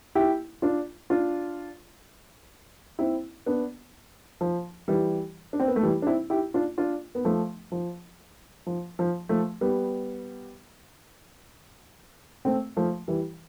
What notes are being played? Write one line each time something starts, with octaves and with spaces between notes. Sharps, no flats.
E4 G4
D4 F4
D4 F4
C4 E4
B3 D4
F3
E3 G3
D4
C4
B3
A3
E3 G3
D4
C4 E4
E4 G4
D4 F4
D4 F4
B3
F3 A3
F3
F3
F3
F3 A3
G3 B3
A3 C4
F3 A3
E3 G3